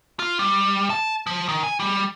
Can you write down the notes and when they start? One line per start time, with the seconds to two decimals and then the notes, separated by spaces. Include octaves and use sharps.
0.19 F4
0.39 G3
0.90 A5
1.27 F3
1.48 D#3
1.63 G#5
1.79 G3